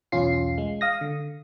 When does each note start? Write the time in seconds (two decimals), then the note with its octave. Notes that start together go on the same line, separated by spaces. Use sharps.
0.12 B1 E2 C#4 F4 C7
0.58 G#3
0.81 F5 D#6 A#6
1.01 D3